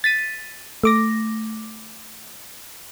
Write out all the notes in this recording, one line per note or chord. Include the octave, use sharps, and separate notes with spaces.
A6 B6 D#7
A3 D6 A#6